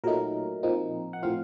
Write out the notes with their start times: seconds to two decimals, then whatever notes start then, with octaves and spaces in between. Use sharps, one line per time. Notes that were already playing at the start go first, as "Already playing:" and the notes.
0.04 A#2 F#3 A3 D#4 A#4
0.63 A#2 F3 C4 D#4
1.13 F#5
1.23 A2 F3 C4 F4 F5